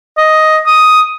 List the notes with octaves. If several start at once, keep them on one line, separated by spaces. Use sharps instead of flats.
D#5
D#6